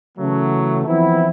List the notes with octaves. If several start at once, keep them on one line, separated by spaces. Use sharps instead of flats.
C#3 E3 F#3 A3
E3 F3 B3 C4 E4